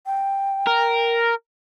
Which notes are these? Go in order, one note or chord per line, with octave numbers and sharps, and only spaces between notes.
G5
A#4